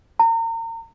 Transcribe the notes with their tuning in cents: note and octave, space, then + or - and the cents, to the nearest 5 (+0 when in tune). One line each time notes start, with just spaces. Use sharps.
A#5 -35